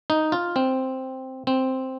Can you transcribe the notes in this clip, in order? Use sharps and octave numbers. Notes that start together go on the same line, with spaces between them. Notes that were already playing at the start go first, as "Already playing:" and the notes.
D#4
F4
C4
C4